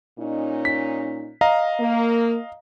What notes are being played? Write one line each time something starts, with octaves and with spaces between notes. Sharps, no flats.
A#2 C#4 D#4
B6
D#5 F5 A#5
A#3